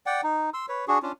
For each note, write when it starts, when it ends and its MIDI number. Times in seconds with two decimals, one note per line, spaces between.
0.06 0.21 74
0.06 0.21 78
0.06 0.21 79
0.23 0.50 63
0.54 0.66 84
0.54 0.66 88
0.69 0.85 71
0.69 0.85 73
0.88 0.99 62
0.88 0.99 66
0.88 0.99 68
1.03 1.12 61
1.03 1.12 62
1.03 1.12 65